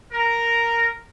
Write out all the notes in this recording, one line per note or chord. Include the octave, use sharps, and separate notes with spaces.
A#4